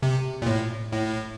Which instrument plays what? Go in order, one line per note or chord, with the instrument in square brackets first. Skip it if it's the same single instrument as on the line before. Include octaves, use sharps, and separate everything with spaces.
[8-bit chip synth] C3
A#2
A2
A2